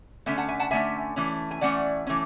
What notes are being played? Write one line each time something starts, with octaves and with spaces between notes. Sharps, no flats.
D3 A3 C#4 E5 G#5
F#5 A5
E5 G#5
F#5 A5
D3 A3 C#4 E5 G#5
E3 A3 C#4
G#5
E3 A3 C#4 D5 F#5
E3 A3 C#4